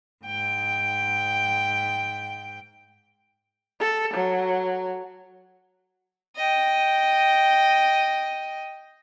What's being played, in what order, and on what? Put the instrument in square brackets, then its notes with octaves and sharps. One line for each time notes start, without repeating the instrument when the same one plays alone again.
[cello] G#2 G5
[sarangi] A4
F#3
[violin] D#5 G5